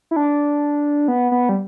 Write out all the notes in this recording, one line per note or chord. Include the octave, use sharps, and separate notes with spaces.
E4
D4
B3
B3
G3